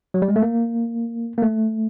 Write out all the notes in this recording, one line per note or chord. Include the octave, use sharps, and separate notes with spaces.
F#3
G3
G#3
A3
A#3
A#3
A3